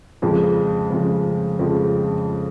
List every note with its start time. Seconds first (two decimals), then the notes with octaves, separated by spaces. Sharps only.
0.22 F2 C#3 F3 G#3
0.90 F2 C#3 F3 G#3
1.59 F2 C#3 F3 G#3